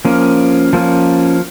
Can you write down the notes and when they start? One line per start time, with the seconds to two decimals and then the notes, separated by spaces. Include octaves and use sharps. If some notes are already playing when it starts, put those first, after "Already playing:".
0.05 F3 A#3 C#4
0.73 F3 A#3 C#4